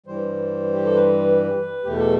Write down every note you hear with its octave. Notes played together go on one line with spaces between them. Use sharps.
G2 E3 G3 C5
G4
A4
B4
E2 B2 A3 G4
A4